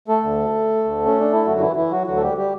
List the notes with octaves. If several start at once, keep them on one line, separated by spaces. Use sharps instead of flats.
A3 A4
D2 D3
D2 D3
C#4
D4
E4
F#2 D3 F#3 F#4
E3 E4
E3 E4
F#3 F#4
D2 D3 F#3 F#4
A4
G3 G4
G3 G4